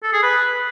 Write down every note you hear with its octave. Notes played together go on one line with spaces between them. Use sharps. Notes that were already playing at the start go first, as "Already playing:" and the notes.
A4
G#4
B4